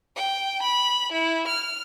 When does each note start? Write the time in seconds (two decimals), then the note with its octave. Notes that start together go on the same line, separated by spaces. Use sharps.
0.16 G5
0.62 B5
1.12 E4
1.47 F6